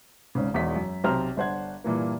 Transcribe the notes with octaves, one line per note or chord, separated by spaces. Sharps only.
G#1 C#2 G#2 C#3
E1 E2 D#4 C5 B6
F#2
B1 C3 C5 G5 A#5 F6
G1 D4 C5 F#5 G#6
G2 A#2 E3 A#3